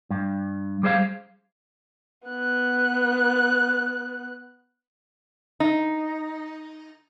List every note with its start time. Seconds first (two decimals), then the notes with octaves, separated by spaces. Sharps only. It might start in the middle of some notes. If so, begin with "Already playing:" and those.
0.10 G2
0.83 G3 G#4 C5 D#5 F5
2.28 B3 F#6
5.60 D#4